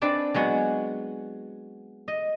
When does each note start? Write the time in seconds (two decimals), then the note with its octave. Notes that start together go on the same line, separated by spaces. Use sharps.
0.02 C4 D4 B4 D5 A5
0.34 F#3 G#3 B3 F#4
2.08 D#5